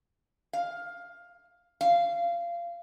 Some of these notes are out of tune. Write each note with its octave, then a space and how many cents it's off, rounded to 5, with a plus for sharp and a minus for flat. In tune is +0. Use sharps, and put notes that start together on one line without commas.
F5 +15
F5 -20